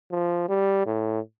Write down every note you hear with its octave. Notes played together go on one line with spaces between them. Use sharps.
F3
G3
A2